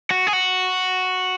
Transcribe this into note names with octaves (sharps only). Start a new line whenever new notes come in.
F#4
G#4
F#4